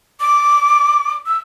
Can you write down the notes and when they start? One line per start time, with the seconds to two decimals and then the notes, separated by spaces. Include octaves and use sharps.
0.21 D6
1.26 E6